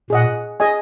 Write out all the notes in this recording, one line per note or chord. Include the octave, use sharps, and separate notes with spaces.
A#2 G#4 D#5 F#5
G#4 D#5 G#5